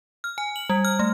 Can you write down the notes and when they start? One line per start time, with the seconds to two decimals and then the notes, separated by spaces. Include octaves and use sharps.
0.24 F6
0.38 G#5
0.56 F#7
0.70 G3
0.85 F6
0.99 A3